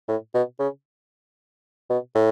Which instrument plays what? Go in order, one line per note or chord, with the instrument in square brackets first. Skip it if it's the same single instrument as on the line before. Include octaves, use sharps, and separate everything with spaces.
[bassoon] A2
B2
C#3
B2
A2